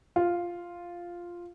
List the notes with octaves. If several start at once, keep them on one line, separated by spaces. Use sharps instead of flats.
F4